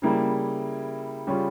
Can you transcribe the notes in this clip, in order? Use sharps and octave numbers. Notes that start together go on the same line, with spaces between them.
C#3 G3 A#3 E4
C#3 G3 C#4 F4